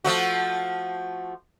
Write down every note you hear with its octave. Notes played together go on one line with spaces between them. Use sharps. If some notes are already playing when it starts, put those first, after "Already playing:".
F3 A3 F#4